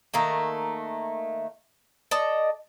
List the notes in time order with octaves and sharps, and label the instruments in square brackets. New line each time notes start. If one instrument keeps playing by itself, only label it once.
[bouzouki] D#3 A3 A#3
A4 D5 D#5